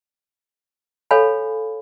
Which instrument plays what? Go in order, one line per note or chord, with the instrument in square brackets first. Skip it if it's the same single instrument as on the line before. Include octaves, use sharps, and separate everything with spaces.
[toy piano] A4 C#5 F5 G#5 B5